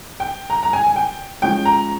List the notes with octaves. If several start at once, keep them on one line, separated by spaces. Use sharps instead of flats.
G5
A#5
A#5
G#5
G#5
G5
F3 G#3 C#4 G5
A#5